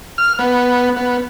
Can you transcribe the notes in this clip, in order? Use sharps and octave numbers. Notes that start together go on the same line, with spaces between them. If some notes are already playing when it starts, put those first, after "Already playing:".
F6
B3
B3